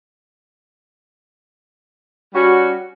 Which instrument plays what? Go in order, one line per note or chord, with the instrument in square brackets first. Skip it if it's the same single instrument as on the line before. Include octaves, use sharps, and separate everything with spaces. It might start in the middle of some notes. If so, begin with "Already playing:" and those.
[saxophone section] G3 C#4 F#4